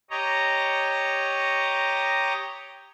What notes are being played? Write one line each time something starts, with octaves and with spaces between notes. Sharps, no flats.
G4 C#5 D#5 A#5